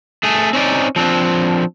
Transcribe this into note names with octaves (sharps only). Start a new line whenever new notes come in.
A3 G#4
C4 C#4 D#4 D5
F3 C4 D4